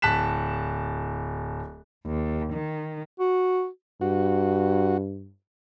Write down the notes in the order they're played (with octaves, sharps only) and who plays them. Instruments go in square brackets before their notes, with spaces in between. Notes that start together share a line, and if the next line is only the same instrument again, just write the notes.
[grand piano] D1 A5 F#6 B6 E7
[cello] D#2
D#3
[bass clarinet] F#4
[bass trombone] G2 [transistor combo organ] F#4